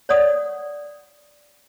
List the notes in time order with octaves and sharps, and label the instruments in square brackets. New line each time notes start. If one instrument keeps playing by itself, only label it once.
[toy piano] C#5 D5 F#5 D#6